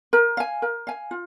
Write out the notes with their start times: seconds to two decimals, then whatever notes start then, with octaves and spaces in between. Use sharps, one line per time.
0.13 A#4
0.37 F5 G#5
0.62 A#4
0.87 F5 G#5
1.11 F4